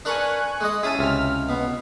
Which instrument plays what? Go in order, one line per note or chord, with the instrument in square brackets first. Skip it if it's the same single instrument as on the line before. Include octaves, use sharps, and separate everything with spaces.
[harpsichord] D4 A#4 B4 [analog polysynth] G#5 C#6 F#6
[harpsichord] G#3 D#5
[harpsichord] C#4 E4 [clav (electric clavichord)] G#4 A5 [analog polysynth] D#7
[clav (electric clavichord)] C#2 C3 E5 [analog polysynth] F6
[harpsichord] B2 [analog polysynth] B3